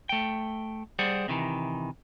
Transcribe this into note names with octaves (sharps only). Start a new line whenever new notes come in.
A3 G5
G3 G#4 C5 D5 F#5
C3 D#3 E3